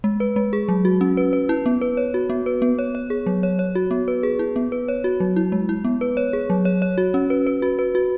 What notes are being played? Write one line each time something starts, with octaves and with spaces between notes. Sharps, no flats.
G#3
B4
G#3
G#4
F#3
F#4
C#4
B4
B4
E4
B3
B4
C#5
F#4
B3
B4
B3
C#5
C#5
G#4
F#3
C#5
C#5
F#4
B3
B4
G#4
E4
B3
B4
C#5
F#4
F#3
E4
G#3
E4
B3
B4
C#5
G#4
F#3
C#5
C#5
F#4
C#4
B4
B4
F#4
B4
F#4